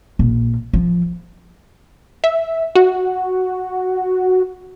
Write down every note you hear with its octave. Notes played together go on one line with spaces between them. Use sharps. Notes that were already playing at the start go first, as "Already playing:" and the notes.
A#1
F3
E5
F#4